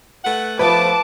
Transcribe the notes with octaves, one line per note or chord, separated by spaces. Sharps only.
A3 B4 F#5
F3 A3 B3 B4 A5 D6